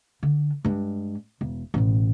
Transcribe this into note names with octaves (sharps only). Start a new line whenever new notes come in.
D3
G2 G#3
E1
A1 B2